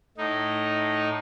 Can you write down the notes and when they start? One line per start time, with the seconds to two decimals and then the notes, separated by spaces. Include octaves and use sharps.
0.17 A2 D#4